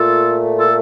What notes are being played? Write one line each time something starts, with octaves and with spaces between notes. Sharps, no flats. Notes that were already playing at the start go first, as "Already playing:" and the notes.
Already playing: A#2 A3 F4 A4
F4 A4